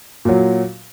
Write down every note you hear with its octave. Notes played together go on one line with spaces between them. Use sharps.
A#2 F#3